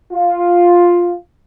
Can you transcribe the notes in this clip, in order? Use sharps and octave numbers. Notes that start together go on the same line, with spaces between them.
F4